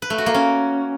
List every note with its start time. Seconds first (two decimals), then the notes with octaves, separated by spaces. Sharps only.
0.02 B4
0.10 A3
0.18 F#4
0.26 A#3
0.34 C#4